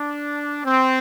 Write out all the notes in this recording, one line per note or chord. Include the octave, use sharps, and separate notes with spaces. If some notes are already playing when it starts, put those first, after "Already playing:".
Already playing: D4
C4